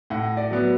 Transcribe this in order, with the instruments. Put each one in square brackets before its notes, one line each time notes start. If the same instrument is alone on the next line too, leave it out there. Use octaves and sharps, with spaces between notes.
[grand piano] A2 F#5
D5
F#3 B3